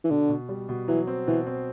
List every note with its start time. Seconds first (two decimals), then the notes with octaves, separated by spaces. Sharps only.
0.04 E3
0.10 B2 D3
0.29 B2
0.49 G3
0.69 B2
0.88 E3 F#3
1.07 C4
1.27 B2 E3
1.47 C4